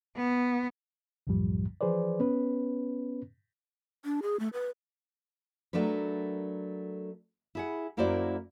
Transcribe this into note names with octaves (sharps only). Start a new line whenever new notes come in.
B3
C2 F#2 A2 F3 G3
E3 F3 G#4 B4 C5 D5
B3 C#4 B4
D4
G#4
A3
B4
F#3 A3 D4 A#4 B4
E4 G#4 F#5
F#2 A#3 E4 F#4 C5 D5